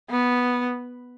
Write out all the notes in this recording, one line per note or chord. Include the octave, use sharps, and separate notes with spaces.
B3